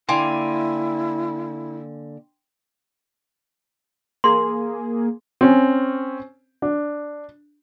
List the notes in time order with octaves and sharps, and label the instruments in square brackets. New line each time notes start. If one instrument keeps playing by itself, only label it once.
[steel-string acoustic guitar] D3 A#3 G#5 [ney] E4 [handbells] G5 C6
[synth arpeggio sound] A#3 G#4 [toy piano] C6
[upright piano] C4 C#4
D4